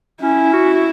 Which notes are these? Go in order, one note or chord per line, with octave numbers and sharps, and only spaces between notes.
C#4 E4
F#4
F#4